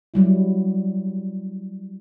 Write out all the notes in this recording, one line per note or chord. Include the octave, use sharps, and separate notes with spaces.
F#3 G3 E4